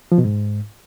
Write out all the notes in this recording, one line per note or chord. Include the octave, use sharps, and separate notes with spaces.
F3
B2
G#2